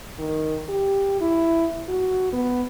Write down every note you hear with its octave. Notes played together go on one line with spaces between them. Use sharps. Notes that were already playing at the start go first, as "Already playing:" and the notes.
D#3
G4
E4
F#4
B3